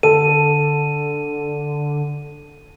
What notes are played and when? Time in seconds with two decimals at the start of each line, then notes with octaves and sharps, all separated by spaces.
0.03 D3 A4 D#7